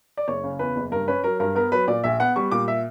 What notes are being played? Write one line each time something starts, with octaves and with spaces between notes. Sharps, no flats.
D5
F#1 C#5
C#3
E2 B4
F#1
G2 A#4
C#4 B4
F#3 A#4
G2 A#4
B3 A#4
F#3 B4
A#2 D5
A#1 E5
B3 F#5
G3 C#6
A#2 D6
E5